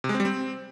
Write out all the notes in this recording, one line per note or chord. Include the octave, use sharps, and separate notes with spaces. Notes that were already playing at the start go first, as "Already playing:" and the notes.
C3
G#3
C4
G3
C4